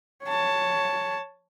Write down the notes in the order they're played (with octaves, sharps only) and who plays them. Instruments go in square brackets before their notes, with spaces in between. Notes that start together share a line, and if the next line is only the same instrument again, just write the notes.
[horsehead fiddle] C#5 A5